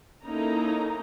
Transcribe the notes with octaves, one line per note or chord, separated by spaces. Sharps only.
A#3 C#4 D#4 E4 A4 A#5